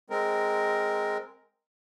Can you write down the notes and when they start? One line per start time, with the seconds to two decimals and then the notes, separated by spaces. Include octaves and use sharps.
0.10 G#3 C4 A#4